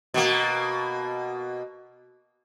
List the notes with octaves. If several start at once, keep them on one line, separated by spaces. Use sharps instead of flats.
B2 A#3